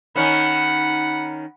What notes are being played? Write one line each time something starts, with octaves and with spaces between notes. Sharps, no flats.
D#3 C#4 D#4 F#5 B5